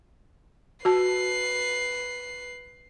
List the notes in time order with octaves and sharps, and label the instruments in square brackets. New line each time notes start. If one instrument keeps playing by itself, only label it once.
[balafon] F#4 A5 [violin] B4 C7